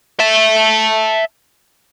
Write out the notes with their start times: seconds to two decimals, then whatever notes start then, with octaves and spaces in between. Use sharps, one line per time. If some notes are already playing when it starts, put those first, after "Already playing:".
0.20 E5 A5